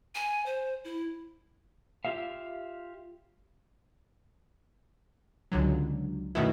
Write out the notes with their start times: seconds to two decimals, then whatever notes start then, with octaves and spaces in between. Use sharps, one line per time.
0.15 G#5
0.46 C5
0.84 E4
2.05 F4 G4 E5 F5
5.52 C#2 D3 F#3
6.35 F#2 B2 D#3 A3 B3 E4